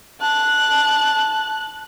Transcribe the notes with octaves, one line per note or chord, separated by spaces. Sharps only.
A5 F#6